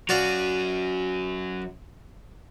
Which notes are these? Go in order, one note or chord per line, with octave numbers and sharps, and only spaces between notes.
F#3 C#4 F#4 D5 F5